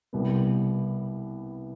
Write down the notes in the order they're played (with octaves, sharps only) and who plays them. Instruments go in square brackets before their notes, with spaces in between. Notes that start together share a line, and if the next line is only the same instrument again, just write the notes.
[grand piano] C2 B2 G3 B3